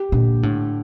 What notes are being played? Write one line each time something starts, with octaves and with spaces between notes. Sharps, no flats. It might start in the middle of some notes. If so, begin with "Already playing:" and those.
Already playing: G4
A#2 D3
A2 D3